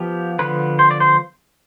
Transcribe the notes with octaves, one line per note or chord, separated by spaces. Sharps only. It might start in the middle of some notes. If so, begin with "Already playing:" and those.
Already playing: F3 B3 G4
D3 F3 B3 B4
C5
D5
C5